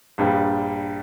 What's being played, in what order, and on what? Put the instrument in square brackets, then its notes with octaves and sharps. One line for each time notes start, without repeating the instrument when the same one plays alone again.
[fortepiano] A#1 G2